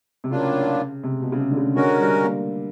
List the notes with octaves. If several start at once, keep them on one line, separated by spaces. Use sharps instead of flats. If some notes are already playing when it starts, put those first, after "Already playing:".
C3
A2 C#3 F#3 A#3 D4 F4
C3
B2
C#3
C3
D3
C#3
D3 G#3 C#4 F#4 A#4
G3
A#3